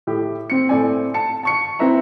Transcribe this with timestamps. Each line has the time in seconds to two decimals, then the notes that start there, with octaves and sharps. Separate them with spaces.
0.07 A2 G4
0.50 C4 C#7
0.69 A2 A3 C4 D5 G#5
1.14 A5 C#7
1.43 A5 C#6 C#7
1.79 C4 E4 B4 E5 A#5